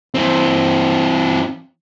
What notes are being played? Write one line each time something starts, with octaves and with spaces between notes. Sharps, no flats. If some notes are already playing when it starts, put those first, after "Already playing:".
E3 C4